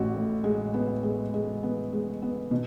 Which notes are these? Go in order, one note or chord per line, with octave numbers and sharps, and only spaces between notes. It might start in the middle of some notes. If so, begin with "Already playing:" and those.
Already playing: A1 F#4
A2
G#3
B3
G#3
G#3
B3
G#3
B3
B2